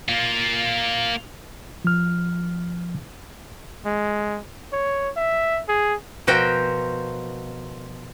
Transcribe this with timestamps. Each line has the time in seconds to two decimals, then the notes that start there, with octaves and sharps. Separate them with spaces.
0.09 A#3 F4
1.84 F3 F6
3.85 G#3
4.73 C#5
5.16 E5
5.68 G#4
6.27 B2 F3 F#4 A#4 C5 G5